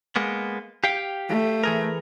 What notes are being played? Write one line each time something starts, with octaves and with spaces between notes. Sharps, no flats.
G#3 A#3 B3
G4 F5 G5
A3
E3 G#4 A#4